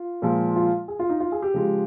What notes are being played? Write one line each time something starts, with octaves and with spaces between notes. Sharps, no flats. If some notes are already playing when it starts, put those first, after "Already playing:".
Already playing: F4
A#2 F3 G#3
F4
G#4
F4
D#4
F4
G#4
G4
C#3 F3 G#3